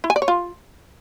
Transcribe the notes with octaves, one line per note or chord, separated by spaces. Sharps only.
E4
G#5
D5
C#5
F4